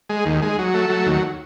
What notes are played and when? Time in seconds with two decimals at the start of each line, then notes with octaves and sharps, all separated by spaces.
0.10 G#3
0.26 D#2
0.42 G#3
0.58 F#3
0.74 A3
0.90 F#3
1.06 D#2